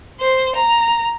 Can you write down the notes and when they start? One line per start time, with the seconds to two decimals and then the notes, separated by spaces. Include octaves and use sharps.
0.20 C5
0.55 A#5